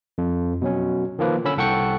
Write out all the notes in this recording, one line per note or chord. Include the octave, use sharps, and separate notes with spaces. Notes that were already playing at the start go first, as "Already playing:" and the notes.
F2
B2 F#3 C#4
D#3 F3 A#3 B4
D3 C#4 B5 E6
C2 A4 F#5 G5 C#6 C#7